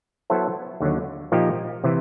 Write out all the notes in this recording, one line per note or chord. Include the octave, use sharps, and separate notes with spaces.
F#3 B3 E4 A4 C5
D#2 D3 F#3
A#2 F3 A#3 D#4 G4
C3 E3